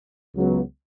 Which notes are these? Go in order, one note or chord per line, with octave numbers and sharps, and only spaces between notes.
C#2 C#3 F#3 B3